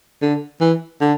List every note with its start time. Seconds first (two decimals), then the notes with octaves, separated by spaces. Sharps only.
0.22 D3
0.61 E3
1.01 D3